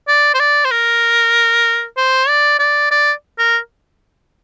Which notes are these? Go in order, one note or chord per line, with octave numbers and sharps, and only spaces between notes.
D5
C5
D5
C5
A#4
C5
D5
D5
D5
A#4